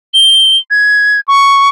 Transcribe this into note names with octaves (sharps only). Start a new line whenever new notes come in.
G7
G#6
C#6